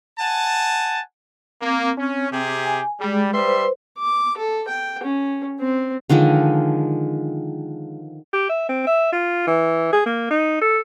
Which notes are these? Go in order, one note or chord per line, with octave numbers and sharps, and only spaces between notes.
F#5 G#5 A5
A#3 C4
C#4
C3 G4 G#4
G#5
G3 G#3 G#4
G3 B4 C5 E5 C6
D6
A4
G5
C#4
C4
D3 D#3 F3 G#3
G4
E5
C4
E5
F4
E3
G#4
A#3
D#4
A4